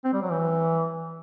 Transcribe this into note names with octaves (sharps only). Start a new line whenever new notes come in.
C4
G3
F#3
E3